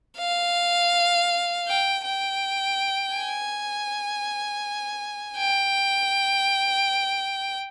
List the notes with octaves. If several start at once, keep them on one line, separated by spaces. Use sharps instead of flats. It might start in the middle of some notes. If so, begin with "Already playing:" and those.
F5
G5
G5
G#5
G5